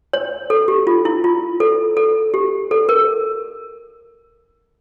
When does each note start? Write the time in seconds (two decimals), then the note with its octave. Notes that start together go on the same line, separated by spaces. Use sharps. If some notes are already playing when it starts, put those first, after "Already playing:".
0.13 C#5
0.50 A4
0.68 G4
0.87 F4
1.05 E4
1.24 F4
1.60 A4
1.97 A4
2.34 G4
2.71 A4
2.89 A#4